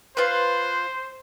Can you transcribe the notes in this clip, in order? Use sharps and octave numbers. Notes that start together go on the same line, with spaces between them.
F4 B4 C5